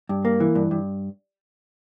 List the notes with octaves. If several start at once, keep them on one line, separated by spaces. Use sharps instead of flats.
G2
A#3
E3
G2
G2